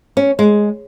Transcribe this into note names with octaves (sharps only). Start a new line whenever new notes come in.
C#4
G#3